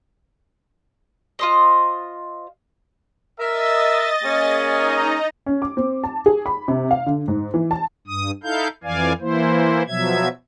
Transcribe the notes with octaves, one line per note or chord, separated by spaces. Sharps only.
F4 C5 D#5
A#4 D#5 E5 A6
A#3 C#4 G#4
D#4 D#5 A#5
C#4
D6
C4
A5
G#4
B5
C3
F5
D3
G#2
E3
A5
G2 D#6
D#4 E4 A4 F5 G6
F2 E3 D5 F5 G#5
E3 A#3 E4 C5
B2 F3 F#3 E5 G#6